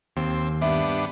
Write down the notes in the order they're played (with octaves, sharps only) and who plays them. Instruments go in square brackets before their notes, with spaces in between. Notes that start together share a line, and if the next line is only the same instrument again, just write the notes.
[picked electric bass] D#2 [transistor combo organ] C4
[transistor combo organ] G2 B3 D4 [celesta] E5